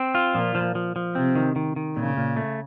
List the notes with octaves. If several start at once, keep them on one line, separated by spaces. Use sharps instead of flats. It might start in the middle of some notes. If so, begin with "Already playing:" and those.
Already playing: C4
F4
A#2 F3
F3
F3
F3
C3 C4
D#3
D#3
D#3
A#2 C#3
A#2
A3